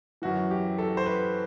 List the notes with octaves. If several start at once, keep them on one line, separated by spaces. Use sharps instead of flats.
F#2 E3 F#4
G4
A4
C5
B4